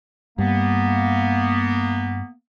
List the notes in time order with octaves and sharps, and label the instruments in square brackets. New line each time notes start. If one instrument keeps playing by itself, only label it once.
[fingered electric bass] G2 [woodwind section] A#3 B3